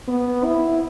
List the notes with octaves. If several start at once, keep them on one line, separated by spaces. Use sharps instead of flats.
B3
E4